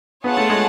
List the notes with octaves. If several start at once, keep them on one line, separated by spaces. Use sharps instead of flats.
B3 F4 G#4 C#5 F#5 A5
A3
G#3